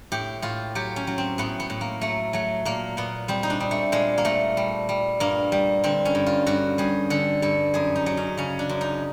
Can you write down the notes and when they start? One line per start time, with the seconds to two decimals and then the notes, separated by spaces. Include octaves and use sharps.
0.12 A2 G4
0.42 A2 F4
0.75 F#3 G4
0.96 C#4
1.07 F#3
1.18 C4
1.38 A2 B3
1.60 B3
1.70 A2
1.81 A#3
2.01 F#3 A3
2.33 F#3 A3
2.65 A#2 A#3
2.97 A#2 B3
3.28 G3 C4
3.43 D#4
3.50 D4
3.60 G3
3.71 A3
3.92 A#2 G#3
4.18 A#3
4.25 A#2 A3
4.57 G3
4.89 G3
5.20 G2 A#3
5.52 G3
5.84 D3 C4
6.05 C#4
6.15 G2
6.26 F4
6.46 G2 F#4
6.78 G3 G#4
7.10 D3 A4
7.42 G2 A4
7.74 F#2 G#4
7.96 D#4
8.06 F#3
8.17 C#4
8.38 C#3 C#4
8.59 D4
8.69 F#2
8.81 D#4